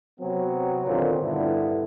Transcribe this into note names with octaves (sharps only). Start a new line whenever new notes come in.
C3 F#3 B3 C4
D#2 A#2 D3 C4
G2 D3 B3 E4